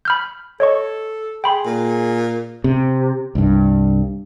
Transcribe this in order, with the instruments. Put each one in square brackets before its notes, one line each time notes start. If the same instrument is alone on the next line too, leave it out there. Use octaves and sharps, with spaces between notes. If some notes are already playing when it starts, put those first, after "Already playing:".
[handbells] B5 F6 G6
[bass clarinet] A4 [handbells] C#5 D#5 C#6
[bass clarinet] G#4 [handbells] G5 B5 C6
[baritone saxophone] A#2
[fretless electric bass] C3
C2 G2